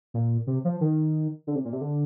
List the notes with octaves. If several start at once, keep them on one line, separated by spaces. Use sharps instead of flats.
A#2
C3
F3
D#3
D3
C3
A#2
C3
D3